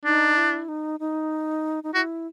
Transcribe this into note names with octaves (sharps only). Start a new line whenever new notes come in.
D4 D#4
E4
D#4
D#4
D#4
E4 F#4